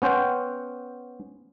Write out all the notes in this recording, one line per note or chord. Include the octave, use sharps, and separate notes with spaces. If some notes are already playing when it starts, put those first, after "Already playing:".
B3 C#4 C5 F#5 G5